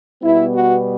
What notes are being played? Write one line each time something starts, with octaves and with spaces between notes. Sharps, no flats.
B2 G3 B3 E4
F#4